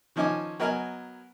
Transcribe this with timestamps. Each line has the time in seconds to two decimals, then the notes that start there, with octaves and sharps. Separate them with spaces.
0.16 D#3 F3 C#4 D#5 G#5 D6
0.60 F#3 B3 A#4 D#5 G#5 F6